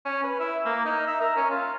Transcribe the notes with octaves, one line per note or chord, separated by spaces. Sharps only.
C#4
B4
E4
A#3
D#4
E5
A#4
C#4
F4